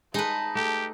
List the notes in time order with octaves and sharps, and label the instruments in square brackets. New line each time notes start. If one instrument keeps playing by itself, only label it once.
[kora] G#3 [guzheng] D#4 B4 [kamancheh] A5
[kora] A3 [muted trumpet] G4